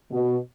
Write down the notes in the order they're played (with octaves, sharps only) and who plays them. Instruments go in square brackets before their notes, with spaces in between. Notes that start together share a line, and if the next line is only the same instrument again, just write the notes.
[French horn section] B2